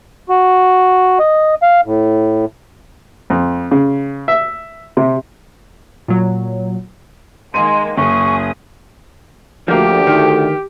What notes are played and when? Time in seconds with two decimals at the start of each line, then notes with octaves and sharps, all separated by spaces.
0.29 F#4
1.19 D#5
1.62 F5
1.86 A2
3.30 F2
3.71 C#3
4.28 E5
4.97 C3
6.08 A#2 F#3
7.54 D#3 G#3 A#3 C6 D#7
7.98 F#1 G#4 C#6 D#6
9.68 D2 F3 A#3 G4
10.07 D#3